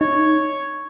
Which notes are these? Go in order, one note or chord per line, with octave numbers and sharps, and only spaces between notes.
D#4 C#5